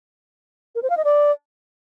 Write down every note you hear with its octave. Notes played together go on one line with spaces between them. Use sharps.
A#4
C5
F5
D#5
D5